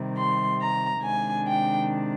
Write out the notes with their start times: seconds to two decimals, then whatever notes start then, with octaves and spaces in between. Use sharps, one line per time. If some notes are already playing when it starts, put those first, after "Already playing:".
Already playing: C3 D#3 G3
0.17 C6
0.61 A#5
1.03 C3 D#3 G#3 D4 G#5
1.46 G5